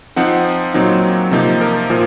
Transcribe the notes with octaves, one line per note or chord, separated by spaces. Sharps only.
F3 C4 D#4 F#5
A#2 F#3 C4 D#4
C3 F3 A#3 D#4
A#4
A#2 F3